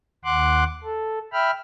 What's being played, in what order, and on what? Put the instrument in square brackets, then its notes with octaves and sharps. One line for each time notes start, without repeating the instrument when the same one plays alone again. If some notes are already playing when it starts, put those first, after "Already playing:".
[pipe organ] D#2 F#5 C6 D6 F#6
A4
E5 G5 B5 F6